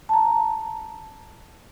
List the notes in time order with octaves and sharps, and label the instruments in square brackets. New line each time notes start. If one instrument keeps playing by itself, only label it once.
[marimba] A5 A#5